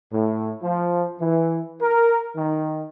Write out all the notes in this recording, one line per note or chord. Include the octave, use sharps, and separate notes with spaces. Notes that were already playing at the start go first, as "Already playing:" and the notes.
A2
F3
E3
A#4
D#3